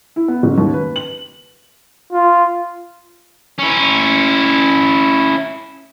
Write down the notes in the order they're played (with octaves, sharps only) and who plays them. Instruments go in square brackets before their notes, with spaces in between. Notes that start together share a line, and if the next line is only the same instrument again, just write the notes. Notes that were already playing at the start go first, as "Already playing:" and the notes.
[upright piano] E4
B3
F#1
D#2
B4
F#7
[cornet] F4
[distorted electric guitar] C#4 E4